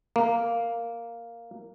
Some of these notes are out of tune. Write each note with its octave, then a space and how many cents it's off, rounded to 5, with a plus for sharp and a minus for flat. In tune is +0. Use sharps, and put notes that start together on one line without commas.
A#3 -5